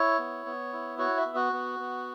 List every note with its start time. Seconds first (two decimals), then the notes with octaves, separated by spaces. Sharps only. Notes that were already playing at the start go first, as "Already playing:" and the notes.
Already playing: E4 C#5
0.19 B3
0.46 B3
0.73 E4
0.98 F#4 C#5
1.17 E5
1.25 B3
1.35 F#4
1.53 B3
1.79 B3